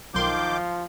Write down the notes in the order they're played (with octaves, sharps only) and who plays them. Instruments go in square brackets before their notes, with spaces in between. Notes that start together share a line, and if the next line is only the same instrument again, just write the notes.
[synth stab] B1 C6 [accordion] D#3 D6 G6 [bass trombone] F3